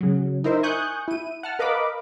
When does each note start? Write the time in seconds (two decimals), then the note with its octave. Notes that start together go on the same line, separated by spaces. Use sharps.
0.01 C#3 F#3
0.44 D#4 E4 A#4 C5 E5
0.63 G#5 C#6 D#6 F#6 G6
1.08 E4 D#7
1.43 F#5 A5 F6
1.59 A#4 B4 D#5 F5 B5 D6